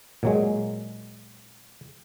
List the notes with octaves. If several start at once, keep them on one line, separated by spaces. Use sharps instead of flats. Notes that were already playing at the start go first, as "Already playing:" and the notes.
A#2 F#3 G#3